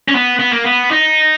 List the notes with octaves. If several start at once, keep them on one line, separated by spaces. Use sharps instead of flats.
C#4
B3
B3
A#3
B3
D#4